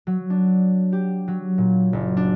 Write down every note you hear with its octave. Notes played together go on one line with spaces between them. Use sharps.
F#3
D4
G4
F#3
A#2
F#1
D4